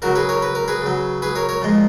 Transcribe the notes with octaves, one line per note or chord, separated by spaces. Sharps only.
C#3 F#3 F#4 A#4
G#4 B4
A#4 C#5
B4
A#4
G#4 B4
C#3 F#3
G#4 B4
A#4 C#5
A#4 C#5
A#2 F3 G#3